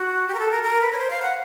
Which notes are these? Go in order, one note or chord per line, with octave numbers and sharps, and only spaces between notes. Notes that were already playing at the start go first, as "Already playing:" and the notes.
Already playing: F#4
G4
A#4
A4
A#4
A#4
B4
C#5
C5
F5
F#5